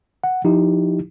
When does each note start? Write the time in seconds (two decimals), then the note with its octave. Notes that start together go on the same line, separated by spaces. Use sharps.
0.24 F#5
0.44 F3 D#4 E4 G4